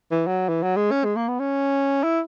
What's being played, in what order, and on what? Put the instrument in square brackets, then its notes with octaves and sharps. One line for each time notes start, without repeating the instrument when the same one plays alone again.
[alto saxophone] E3
F#3
E3
F#3
G#3
C#4
G#3
A#3
B3
C#4
E4